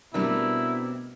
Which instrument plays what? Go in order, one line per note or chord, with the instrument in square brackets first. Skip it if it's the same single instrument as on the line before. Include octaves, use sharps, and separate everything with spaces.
[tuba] B2 [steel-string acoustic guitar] G3 A3 C4 [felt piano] D4 A#4 [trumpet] E4